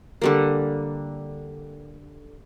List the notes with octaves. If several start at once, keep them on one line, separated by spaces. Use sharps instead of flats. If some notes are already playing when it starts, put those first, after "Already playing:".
D3 G3 A#3